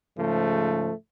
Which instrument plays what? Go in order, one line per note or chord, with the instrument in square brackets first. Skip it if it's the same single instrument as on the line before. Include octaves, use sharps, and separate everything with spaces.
[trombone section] G#2 C#3 F3 A3